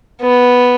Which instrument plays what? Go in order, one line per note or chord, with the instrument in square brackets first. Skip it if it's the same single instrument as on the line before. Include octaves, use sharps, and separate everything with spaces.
[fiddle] B3